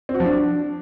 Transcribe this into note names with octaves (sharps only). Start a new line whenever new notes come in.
C4
F#4
F3
D4